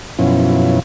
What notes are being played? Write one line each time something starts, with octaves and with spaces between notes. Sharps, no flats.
F#2 B2 F3 C#4 E4